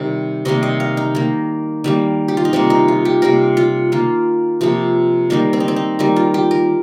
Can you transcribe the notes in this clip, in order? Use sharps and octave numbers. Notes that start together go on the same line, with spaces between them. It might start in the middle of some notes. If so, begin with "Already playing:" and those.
Already playing: C3 D#3 G3
C3 D#3 G3 A#3 D#5
D#5
F5
D#4
D#3 A#3
D#3 G3 A#3
G4
F4
D#4
C3 G3 A#3 C4
D#4
F4
G4
C3 G3 A#3 A#4
F4
D#3 A#3 F4
C3 F3 A#3
D#3 G3 A#3 D#4
C4
D#4
C4
D#4
D#3 G3 A#3
F4
G4
A#4